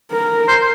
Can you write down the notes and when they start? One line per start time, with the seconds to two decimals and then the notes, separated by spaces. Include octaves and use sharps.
0.12 A#4
0.48 C5